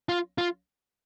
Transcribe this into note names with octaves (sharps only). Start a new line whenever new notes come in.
F4
F4